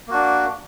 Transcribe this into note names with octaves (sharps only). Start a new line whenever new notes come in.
A#3 D4 F#4